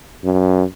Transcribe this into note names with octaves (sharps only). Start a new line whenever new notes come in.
F#2